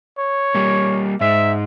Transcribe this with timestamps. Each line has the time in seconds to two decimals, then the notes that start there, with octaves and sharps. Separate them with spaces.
0.18 C#5
0.55 G3 A#3
1.21 G#2 G#3 E5